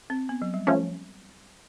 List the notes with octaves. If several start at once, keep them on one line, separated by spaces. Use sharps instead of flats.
C4
B3
F#3
G3
F3 A3 C#4